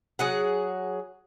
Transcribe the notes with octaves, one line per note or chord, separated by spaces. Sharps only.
F#3 G#4 F#5